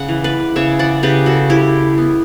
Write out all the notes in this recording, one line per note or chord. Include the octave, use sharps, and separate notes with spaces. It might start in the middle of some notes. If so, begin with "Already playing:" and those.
Already playing: C#3 F#5
E3
B4 D5
C#3 C#5 E5
D5 F#5
C#3 G4 B4
F#4 A4
G3 E4 G4
B3